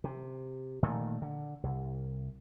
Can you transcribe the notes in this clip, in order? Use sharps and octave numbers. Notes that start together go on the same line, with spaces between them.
C3
A#2 D#3 A3
D3
C2